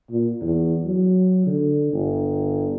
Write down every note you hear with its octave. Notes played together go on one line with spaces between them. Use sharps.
A#2
E2
F#3
D3
G1